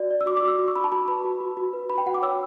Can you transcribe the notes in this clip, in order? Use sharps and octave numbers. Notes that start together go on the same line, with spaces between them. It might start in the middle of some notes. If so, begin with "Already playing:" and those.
Already playing: F#4 D5
D5
E6
F#4 D6
D6
F#4
E6
F#4
C#6
F#4 B5
A5
F#4 B5
B4 B5
F#4
F#4
F#4
B4
F#4 B5
G5
F#4 F#5
D6
C#5 E6